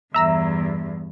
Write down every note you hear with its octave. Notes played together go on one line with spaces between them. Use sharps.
E2 G2 E5 A#5 E6